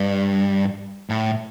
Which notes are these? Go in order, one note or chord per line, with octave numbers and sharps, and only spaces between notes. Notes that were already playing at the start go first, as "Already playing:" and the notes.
Already playing: G2
A2